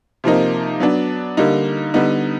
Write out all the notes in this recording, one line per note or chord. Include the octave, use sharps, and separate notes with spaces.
C3 F3 A#3 D#4
F#3 B3 D4
D3 G3 A#3 D#4
D3 G3 B3 D#4